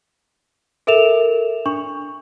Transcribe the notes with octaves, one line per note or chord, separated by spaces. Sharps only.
A4 A#4 E5 E7 F7
D4 C#6